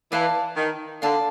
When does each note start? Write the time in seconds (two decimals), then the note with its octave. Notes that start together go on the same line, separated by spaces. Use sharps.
0.12 E3 D5 F5 A5
0.56 D#3
1.02 D3 D5 F5 A5